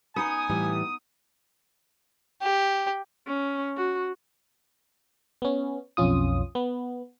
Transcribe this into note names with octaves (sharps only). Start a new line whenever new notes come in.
B3 D#4 G#5 D#6
A2 E3 G3
G4
C#4
F#4
B3 C#4
B1 F2 C#4 F4 D#6
B3